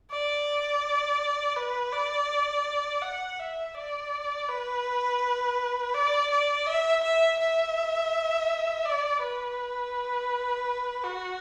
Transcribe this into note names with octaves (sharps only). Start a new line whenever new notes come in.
D5
B4
D5
F#5
E5
D5
B4
D5
D5
E5
E5
E5
D5
B4
F#4